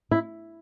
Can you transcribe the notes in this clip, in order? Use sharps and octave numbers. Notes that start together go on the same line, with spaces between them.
E4